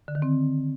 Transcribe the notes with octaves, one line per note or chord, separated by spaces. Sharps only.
D3
D#3
C4